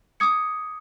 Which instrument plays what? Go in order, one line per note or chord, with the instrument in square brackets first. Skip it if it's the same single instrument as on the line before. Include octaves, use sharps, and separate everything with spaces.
[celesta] D6 D#6 G#6 C#7